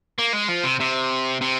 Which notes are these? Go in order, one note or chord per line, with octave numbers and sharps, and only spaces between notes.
A#3
G#3
F3
C3
C3
C3